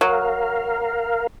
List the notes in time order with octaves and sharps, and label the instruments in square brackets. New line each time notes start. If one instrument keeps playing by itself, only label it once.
[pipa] F#3 [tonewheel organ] A#4 F5